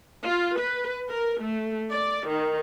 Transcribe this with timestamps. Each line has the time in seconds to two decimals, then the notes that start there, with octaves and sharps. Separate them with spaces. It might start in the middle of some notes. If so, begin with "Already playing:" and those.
0.23 F4
0.59 B4
1.08 A#4
1.41 A3
1.91 D5
2.27 D#3